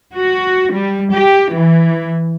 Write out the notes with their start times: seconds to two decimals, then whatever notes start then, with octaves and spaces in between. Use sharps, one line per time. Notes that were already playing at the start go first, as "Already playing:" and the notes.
0.15 F#4
0.73 G3
1.13 G4
1.54 E3